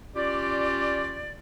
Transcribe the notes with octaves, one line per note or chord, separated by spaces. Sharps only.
C#4 F4 G4 D5